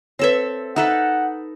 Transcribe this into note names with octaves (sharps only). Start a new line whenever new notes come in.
C4 A4 B4 C#5 E5
D#4 A4 B4 E5 F#5 A#5